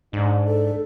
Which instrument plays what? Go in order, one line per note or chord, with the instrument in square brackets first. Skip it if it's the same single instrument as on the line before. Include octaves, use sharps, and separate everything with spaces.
[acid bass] G#2 [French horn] D4
[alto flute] A4